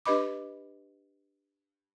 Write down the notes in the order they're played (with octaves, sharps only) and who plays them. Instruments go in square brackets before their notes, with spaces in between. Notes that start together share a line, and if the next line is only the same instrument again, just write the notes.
[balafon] D4 G4 B4 D#5 B5 D6